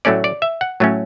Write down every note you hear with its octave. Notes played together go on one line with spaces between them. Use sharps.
A2 F#3 A3 C#4 D5
D5
E5
F#5
A2 F#3 A3 C#4